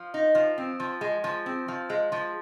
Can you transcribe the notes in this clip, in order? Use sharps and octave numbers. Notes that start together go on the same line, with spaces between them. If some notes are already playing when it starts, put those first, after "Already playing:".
Already playing: F3
D#4
F3
C4
F3
G#3
F3
C4
F3
G#3
F3